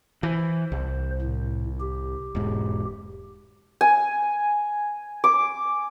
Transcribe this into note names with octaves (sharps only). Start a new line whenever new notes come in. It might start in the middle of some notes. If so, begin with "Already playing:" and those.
E3 C5
C2
A2
G4
E1 G#2
G#5
D6